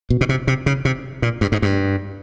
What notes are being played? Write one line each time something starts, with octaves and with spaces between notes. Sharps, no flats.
B2
B2
C3
C3
C#3
C3
A#2
G2
G#2
G2